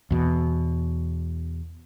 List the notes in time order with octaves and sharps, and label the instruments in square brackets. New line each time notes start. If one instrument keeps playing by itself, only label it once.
[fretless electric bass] E2 B2